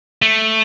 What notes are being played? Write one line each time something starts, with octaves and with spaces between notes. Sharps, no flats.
A3